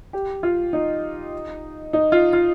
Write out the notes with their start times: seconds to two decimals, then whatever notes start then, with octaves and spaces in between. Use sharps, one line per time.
0.13 G4
0.43 F4
0.73 D#4
1.93 D#4
2.12 F4
2.33 F4